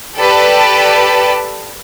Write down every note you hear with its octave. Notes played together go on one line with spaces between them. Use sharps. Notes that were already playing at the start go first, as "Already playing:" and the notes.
G4 A4 B4 D5 A5